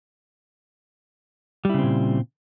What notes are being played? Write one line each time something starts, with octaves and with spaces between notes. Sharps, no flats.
A#2 C#3 G3 C4 E4